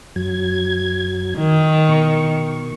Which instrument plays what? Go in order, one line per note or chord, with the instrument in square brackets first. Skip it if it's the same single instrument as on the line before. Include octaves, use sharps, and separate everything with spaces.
[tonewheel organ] F#2 F#3 G#6
[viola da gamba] D#3
[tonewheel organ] B2 C#6